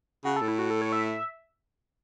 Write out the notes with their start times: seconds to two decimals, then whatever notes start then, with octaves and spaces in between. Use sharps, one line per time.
0.25 C#3 F#4
0.36 A4
0.42 A2
0.48 E4
0.59 F#4
0.70 A4
0.82 C#5
0.92 E5